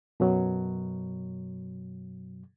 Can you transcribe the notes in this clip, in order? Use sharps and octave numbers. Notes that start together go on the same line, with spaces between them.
F#2 B2 F#3